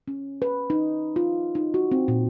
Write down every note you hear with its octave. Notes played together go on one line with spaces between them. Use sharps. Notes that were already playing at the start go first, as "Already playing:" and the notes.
C#4
B4
D#4
F4
D#4
F#4
C4
A#2